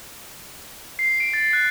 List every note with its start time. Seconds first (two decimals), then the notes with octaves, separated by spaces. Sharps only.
0.99 C7
1.20 D7
1.34 A6
1.53 F#6